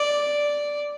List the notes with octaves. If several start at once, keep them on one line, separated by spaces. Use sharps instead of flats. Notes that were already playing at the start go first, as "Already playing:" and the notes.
Already playing: D5